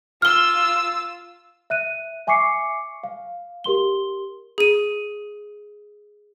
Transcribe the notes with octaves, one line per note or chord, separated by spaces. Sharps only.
F4 E6 F6 G7
E5 F#6 D#7
E5 G#5 C#6 D6 C7 C#7
F5
G4 A#4 C6 G7
G#4 D#7